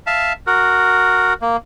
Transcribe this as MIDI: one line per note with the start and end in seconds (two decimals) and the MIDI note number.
0.07 0.33 76
0.07 0.33 77
0.07 0.33 81
0.47 1.34 66
0.47 1.34 70
1.42 1.57 58